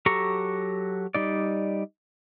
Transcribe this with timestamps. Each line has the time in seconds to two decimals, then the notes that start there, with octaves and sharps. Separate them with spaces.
0.06 F#3 G4 A4 A#5 C#6
1.15 G3 D#4 D5